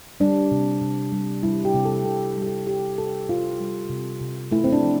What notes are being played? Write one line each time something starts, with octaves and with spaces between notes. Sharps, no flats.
G3 D4
C3
C3
G3
G3 E4
G4
C3
A4
C3 A4
G3
G4
A4
G3 G4
C3 A4
C3 F4
G3
C3
C3
A3 E4
C4
D4
F3